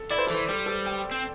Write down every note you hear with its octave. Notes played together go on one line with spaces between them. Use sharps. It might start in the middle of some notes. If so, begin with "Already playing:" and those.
Already playing: A4
E4 D5
C5
A4
E3 C5
G3 A4
A4
G5
C4